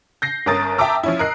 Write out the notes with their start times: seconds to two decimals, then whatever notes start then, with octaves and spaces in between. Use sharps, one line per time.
0.22 G6 A#6 C7
0.46 G1 C#4 A#4 D#6 A6
0.78 E5 G5 A5 A#5 D6 E6
1.03 F3 C#4 E4
1.19 A#4 D#5 F#6 C7